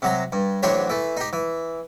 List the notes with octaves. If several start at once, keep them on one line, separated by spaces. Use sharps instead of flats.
C3 F#3 A#5
G2
A1 F#3 D4 G4 C5 C#5
E3 A3
D#4 G4
E3